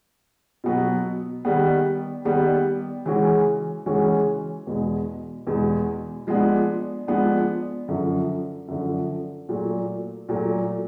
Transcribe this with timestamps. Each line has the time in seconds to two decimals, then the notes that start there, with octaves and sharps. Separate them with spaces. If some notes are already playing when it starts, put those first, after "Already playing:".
0.64 B2 F#3 B3
1.45 D#3 G3 B3
2.25 D#3 G3 B3
3.06 C#3 E3 G#3 C#4 F#4
3.86 C#3 E3 G#3 C#4 F#4
4.67 E2 B2 G#3
5.47 E2 B2 G#3
6.27 F3 G#3 B3 D4
7.07 F3 G#3 B3 D4
7.88 F#2 D3 F3
8.68 F#2 D3 F3
9.49 A#2 F#3 A3
10.29 A#2 F#3 A3